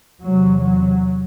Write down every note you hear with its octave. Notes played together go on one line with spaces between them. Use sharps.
E2 C3 F#3
F#3